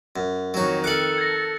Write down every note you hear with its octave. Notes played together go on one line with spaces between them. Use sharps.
F#2
F2 D#3 F#3 F#4 C#5
A4 F5 D6 F#6 C#7 F#7
G#6 A#6